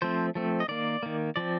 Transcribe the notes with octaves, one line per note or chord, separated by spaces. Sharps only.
F3 A3 C4 C5
F3 A3 C4
D#5
D#3 A#3 D5
D#3 A#3
F3 C4 D5